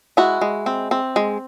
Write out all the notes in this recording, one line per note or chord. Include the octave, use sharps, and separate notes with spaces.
G#3 E4 F#4
G#3
C4
C4
G#3